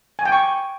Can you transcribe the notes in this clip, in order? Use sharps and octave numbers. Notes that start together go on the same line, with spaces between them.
G#5
G5
C#6